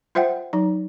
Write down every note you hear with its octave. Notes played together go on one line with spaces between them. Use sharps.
F4 C5 E5 F#5 G5
F#3 D#4